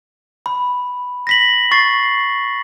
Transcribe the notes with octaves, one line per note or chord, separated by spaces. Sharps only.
B5
A#6 B6 F#7
C#6 A6 C7